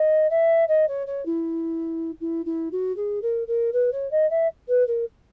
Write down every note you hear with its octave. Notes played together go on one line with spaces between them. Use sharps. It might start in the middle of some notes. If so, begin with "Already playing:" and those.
Already playing: D#5
E5
D#5
C#5
C#5
E4
E4
E4
F#4
G#4
A#4
A#4
B4
C#5
D#5
E5
B4
A#4